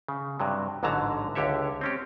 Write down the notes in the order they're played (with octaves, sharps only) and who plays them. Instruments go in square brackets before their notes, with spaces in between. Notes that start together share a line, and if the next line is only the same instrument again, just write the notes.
[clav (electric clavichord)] C#3
G2 C3 F#3
A1 G#2 D3 F#3 A5 A#5
C#2 D3 G4 C#5 E5
C4 C#4 G4